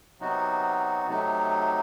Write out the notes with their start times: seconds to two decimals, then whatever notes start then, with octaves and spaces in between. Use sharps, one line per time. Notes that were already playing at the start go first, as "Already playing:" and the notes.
0.20 C3 F#3 B3 D#4 F#4
1.08 C3 F#3 A3 D#4